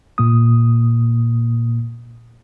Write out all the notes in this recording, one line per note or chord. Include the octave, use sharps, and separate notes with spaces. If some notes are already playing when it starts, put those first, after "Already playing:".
A#2 A#3 D#6